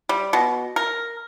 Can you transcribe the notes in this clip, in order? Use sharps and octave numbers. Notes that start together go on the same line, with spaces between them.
G3
B2
A#4